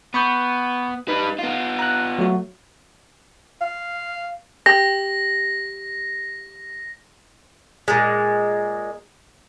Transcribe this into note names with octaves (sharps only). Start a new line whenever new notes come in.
B3 B5 C#6 G6
G3 D#4 B4
B3 F4
A#5 F#6
F#3 A3 F#4
F5
G4 A#6
A#2 G#3